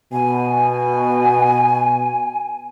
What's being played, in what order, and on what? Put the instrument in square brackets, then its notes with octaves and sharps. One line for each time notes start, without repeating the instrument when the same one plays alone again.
[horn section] B2 [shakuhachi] G#5